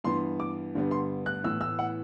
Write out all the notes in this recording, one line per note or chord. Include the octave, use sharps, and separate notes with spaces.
G2 E3 B3 C6
D6
G2 D3 G3 B3
C6
F#6
A2 E3 B3 E6
E6
F#5